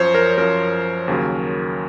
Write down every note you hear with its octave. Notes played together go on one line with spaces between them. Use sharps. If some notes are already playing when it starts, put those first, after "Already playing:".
Already playing: F#2 F3 C5 C#5
A#4
F#2 F3 A#4
D#2 C#3 F#3